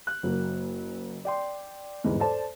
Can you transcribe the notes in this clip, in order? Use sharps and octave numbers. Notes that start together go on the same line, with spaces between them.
F#6
F#1 F#3 A#3
D5 G5 C6
G1 E2 G#2
A4 C5 D5 A5